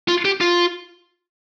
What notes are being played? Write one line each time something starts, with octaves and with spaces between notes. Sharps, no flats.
F4
G4
F4